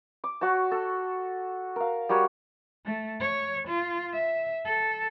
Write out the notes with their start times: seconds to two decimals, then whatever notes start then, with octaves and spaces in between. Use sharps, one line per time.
0.24 D6
0.41 F#4 C#5 A5
0.71 A4
1.76 A#4 F5
2.09 G3 F#4 A#4 C#5
2.85 A3
3.20 C#5
3.68 F4
4.13 E5
4.65 A4